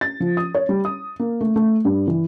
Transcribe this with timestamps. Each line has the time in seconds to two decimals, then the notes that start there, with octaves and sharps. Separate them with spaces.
0.01 A6
0.20 F3
0.37 D#6
0.55 C#5
0.69 G3
0.85 D#6
1.19 A#3
1.41 A3
1.56 A3
1.85 G2
2.07 E3